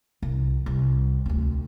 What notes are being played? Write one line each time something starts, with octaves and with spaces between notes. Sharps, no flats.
C2
C2
D2 C4